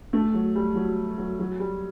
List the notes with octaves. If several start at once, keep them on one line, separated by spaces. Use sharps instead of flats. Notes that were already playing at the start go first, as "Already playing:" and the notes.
A3
F#3
G3
F#3
F#3
F#3
G3